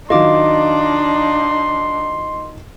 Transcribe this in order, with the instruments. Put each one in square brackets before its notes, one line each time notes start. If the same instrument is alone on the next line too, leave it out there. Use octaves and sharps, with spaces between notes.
[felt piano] D#3 F#3 F4 [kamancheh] D4 D#4 [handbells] D#5 D6 [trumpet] C6